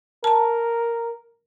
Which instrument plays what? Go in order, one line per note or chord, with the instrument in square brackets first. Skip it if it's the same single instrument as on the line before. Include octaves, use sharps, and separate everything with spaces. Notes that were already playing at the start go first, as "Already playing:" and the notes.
[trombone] A#4 [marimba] A5 A#5